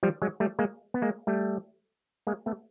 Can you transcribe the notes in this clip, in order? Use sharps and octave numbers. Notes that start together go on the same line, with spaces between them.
F3 G3
F#3 G#3
G3 A3
G#3 A#3
B3
G#3 A#3
G3 A3
G#3 A#3
A3 B3